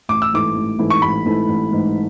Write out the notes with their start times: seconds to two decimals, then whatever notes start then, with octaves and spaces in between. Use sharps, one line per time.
0.09 A1 D6
0.22 E6
0.32 G#2 E3 A3 E4 D6
0.56 A1
0.78 G#2 E3 A3 E4
0.90 C#6
1.02 A1 B5
1.25 G#2 E3 A3 E4
1.48 A1
1.71 G#2 E3 A3 E4